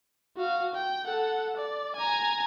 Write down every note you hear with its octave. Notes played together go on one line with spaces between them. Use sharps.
F#4 F5
G5
A4 F#5
D5
G#5 A#5